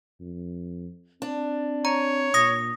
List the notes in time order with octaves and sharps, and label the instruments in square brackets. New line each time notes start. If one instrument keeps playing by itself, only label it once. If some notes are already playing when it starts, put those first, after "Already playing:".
[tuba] F2
[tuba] C4 [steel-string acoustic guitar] D4
[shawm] C#5 [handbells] A#5
[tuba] A#2 [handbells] D#6 A#6